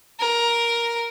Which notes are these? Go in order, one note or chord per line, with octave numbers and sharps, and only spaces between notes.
A#4